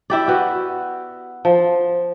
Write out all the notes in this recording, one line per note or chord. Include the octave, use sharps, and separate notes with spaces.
E4 G4 D5
B3 F#4
F3